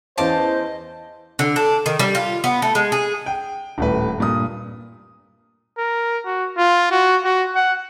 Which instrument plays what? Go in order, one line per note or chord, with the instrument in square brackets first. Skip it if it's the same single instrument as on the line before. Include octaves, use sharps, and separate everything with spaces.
[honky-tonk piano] E2 C#4 [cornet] C5 [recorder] D#5 [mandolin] F5 A5 D6
[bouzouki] D3
D4
D#3
G3
F4
B3
A3
G#3
G#4
[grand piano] G5
D#1 A2 B4
G2 A#2 D#6
[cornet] A#4
F#4
F4
F#4
F#4
F#5